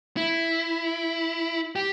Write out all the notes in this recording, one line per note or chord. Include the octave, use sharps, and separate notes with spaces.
E4
G4